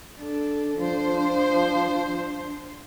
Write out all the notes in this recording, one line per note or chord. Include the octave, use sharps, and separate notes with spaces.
D4 A4
F3 D4 C5